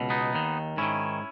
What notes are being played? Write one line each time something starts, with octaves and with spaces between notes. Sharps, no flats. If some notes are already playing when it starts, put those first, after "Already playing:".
Already playing: C#2 B2
B3 D#4
D#2 D#3
G#2 D#3 C#4 E4